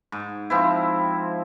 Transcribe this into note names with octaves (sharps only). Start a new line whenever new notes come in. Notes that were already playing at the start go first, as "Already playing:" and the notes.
G#2
F3 C4 E4